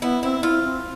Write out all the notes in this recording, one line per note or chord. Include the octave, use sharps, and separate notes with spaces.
B3 E4
C4 E4
E4 F4
C4